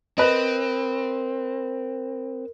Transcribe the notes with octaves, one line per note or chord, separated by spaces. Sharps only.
C4 A#4 B4 D#5